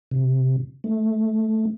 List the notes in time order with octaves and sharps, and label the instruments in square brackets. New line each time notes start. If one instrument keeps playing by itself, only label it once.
[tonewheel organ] C3
A3